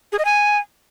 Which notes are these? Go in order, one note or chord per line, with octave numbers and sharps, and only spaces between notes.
G#4
D#5
G#5